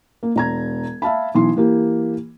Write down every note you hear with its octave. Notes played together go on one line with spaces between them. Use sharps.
A#3
E1 A#5 G#6
E5 F5 A5 B5
B1 E3 C6
E3 A#3 G4